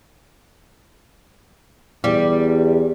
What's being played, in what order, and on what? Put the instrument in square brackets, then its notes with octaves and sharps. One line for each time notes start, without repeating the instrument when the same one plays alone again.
[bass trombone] E2 [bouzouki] G3